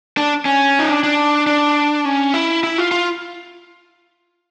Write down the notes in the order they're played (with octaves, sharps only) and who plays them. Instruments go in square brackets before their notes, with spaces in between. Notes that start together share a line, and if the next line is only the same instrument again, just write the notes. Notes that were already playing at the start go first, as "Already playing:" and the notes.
[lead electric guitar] D4
C#4
D#4
D4
D4
D4
C#4
E4
E4
F4
F4